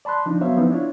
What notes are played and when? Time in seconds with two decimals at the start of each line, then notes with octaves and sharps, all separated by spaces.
0.05 D5 A5 B5 C6 F#6
0.26 F3 D4 D#4
0.41 F#3 B3 C5 C#5 E5 F5
0.57 F3 B3 C4 D#4 E4
0.70 D4 E4 F4 C#5